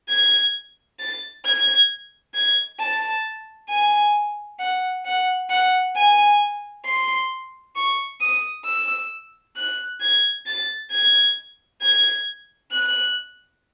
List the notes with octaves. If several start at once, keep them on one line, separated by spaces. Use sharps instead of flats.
G#6
A6
G#6
G#6
A5
G#5
F#5
F#5
F#5
G#5
C6
C#6
D#6
E6
F#6
G#6
A6
G#6
G#6
F#6